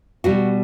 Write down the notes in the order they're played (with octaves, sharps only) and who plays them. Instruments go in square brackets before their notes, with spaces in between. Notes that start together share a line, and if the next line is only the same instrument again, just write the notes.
[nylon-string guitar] B2 G3 F#4